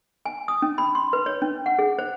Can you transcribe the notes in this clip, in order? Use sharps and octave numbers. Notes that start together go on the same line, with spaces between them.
G#5
D#6
C#4
B5
C6
B4
C#5
C#4
F#5
G#4
C5